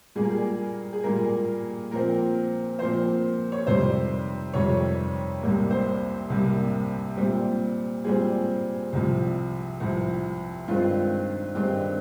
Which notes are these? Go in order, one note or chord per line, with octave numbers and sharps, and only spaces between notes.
A#2 G3 A#3 G#4
A#4
G#4
G#4
A#2 G3 A#3 A#4
A#2 F3 C4 A#4
A#2 F3 C4 C5
C#5
F2 C3 D#3 G3 C5
F2 C3 D#3 G3 C#5
C2 C3 G3 A#3
C5
C2 C3 G3 A#3
A#2 G3 C4
A#2 G3 C4 G#4
C2 C3 F3
C2 C3 F3
G2 D#3 G#3 C4 F4
G2 D#3 G#3 C4 G4